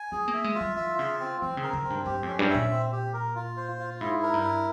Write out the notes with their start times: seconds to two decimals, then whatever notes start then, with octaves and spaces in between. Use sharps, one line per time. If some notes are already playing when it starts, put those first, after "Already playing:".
Already playing: G#5
0.12 C4 G#4
0.28 A#3
0.34 E5
0.44 G#3
0.55 F4
0.61 G3
0.77 E3 E5
0.99 C#3 F4
1.20 C4
1.41 E3 C4
1.57 C#3
1.63 A#4
1.73 C#3
1.84 C4
1.90 G2
2.06 G2 G4
2.23 F2 C#4
2.39 G2
2.49 E5
2.54 A#2
2.71 C4
2.92 G4
3.14 A#4
3.35 F4
3.57 C5
3.79 F4
4.00 G#2 E4
4.23 A#4
4.34 G2
4.43 E4